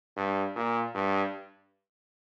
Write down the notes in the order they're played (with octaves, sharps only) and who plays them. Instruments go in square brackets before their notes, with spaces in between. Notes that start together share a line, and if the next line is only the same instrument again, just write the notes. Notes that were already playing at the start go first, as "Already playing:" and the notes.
[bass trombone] G2
A#2
G2